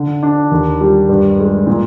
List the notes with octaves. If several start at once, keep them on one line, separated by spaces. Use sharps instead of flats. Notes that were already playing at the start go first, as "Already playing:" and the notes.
Already playing: D3
D4
D#2
G3
G2
G#3
A#2